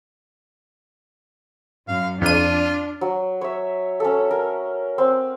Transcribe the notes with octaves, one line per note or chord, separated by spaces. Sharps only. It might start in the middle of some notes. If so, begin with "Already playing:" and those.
F#2 F5
F2 D4 F4 D#7
F#3
C#5 E5
C#4 A4
A#4
C4